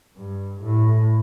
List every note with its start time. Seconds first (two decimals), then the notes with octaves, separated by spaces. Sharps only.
0.17 G2
0.62 A2